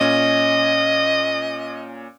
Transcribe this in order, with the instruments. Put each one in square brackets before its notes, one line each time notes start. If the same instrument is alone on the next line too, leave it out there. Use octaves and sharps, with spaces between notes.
[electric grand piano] A#2 C#4 [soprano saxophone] D#5